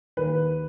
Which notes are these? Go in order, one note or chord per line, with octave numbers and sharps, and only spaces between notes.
D#2 D#3 A#3 B4